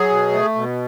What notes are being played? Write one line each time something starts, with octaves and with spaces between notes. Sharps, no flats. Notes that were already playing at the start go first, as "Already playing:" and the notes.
Already playing: F#3 G#4
B2
A3
B2